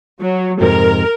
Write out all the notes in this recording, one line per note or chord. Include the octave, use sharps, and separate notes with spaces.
F#3
F2 G#2 C3 A#4